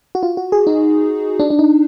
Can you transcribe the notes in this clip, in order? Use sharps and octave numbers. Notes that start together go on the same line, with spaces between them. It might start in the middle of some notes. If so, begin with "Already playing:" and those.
F#4
F4
F#4
G#4
D#4
D4
D4
D#4